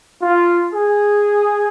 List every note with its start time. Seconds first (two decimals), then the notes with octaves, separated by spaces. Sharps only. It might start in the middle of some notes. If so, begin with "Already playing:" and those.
0.22 F4
0.73 G#4